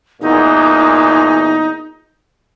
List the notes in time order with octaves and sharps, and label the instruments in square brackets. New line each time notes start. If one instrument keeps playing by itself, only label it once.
[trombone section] E2 A#2 [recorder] D#4